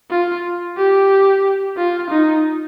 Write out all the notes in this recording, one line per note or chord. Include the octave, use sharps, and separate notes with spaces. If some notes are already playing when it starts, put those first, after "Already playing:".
F4
G4
F4
D#4